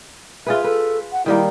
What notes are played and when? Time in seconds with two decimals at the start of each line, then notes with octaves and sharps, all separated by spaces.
0.46 F4 G#4 B4 E5
0.64 A4 B4
1.12 F#5
1.26 D#3 G3 A#3 E4